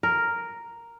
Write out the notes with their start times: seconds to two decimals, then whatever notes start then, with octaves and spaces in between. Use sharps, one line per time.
0.03 A#4